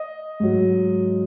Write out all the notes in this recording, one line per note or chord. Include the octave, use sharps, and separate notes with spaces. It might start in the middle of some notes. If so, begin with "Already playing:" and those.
Already playing: D#5
G#2 F#3